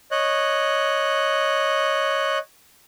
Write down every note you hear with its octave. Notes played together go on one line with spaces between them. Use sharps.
C#5 D#5 F#6